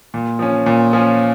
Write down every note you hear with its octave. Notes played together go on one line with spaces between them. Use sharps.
A#2
F3 C#4
A#2
F3 C#4